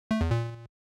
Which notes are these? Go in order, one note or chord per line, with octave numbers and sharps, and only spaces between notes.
A3
E2
A#2